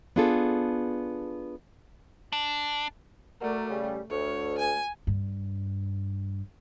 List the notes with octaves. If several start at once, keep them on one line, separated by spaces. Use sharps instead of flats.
B3 D4 F4 G#4 A4
D4
A3 F#4 A#4 D5
C#3 G3
D2 C#5
G#5
G2